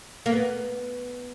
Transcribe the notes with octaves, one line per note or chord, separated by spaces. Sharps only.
A#3
B3